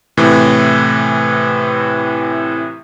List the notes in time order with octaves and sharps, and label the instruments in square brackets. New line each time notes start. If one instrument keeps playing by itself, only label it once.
[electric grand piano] A2 C3 E3